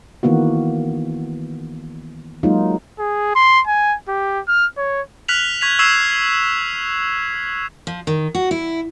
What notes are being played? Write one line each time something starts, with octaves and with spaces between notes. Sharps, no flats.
D#3 E3 A#3 B3 F#4
F#3 G#3 A#3 D#4 F4
G#4
C6
G#5
G4
F6
C#5
F6 F#6 B6 F7 F#7
C#6 G#6 B6 F7
C#6 E6 G#6 C7 E7 F7
F3
D#3
F#4
E4